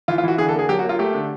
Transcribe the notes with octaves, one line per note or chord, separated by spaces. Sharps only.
E3 F4
F4
E3 F#4
D3 G#4
A4
A#3
G#4
F#3 G4
F#4
A#3 F4
A3 G4
D3